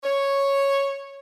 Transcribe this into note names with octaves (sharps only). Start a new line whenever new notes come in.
C#5